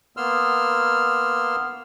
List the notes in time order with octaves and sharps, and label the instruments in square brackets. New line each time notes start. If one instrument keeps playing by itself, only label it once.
[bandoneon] A#3 B3 C6 E6 F6